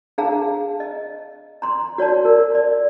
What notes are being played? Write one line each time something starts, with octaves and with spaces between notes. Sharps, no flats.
D4 G#4 F5 A5 A#5
D#5
A#5 C6
F#4 C#5 D5 A5
A#4
D5